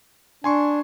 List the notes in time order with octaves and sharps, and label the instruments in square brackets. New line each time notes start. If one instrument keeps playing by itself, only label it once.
[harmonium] D4 [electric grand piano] G#5 C6 C#6